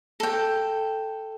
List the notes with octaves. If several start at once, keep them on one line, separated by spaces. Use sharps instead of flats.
A4 G5